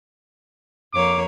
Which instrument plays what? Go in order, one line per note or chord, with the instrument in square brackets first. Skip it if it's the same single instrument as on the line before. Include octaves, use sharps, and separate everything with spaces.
[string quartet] F2 A#3 C#5 [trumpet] D6